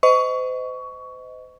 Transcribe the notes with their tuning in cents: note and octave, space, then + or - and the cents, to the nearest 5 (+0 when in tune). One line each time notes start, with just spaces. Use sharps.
C5 -40 D#5 +10 C#6 +20